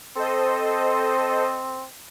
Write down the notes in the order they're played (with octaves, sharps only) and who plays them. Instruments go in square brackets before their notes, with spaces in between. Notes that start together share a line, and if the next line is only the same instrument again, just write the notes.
[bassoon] C4 [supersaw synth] A4 C5 D#5